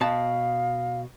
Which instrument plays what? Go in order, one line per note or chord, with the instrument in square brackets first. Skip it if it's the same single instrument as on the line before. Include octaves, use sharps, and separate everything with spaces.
[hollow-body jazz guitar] B2 A5 [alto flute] F5